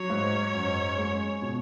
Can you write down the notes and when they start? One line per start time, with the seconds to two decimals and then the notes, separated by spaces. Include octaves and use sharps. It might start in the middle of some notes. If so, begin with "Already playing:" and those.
Already playing: F#3 C#5
0.10 G#2
0.54 F#2
0.98 G#3
1.42 B2